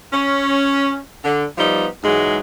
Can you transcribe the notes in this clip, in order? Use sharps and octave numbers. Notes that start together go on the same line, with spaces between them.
C#4
D3
F3 G3 B3 D#4
G#2 E3 F#3 G#3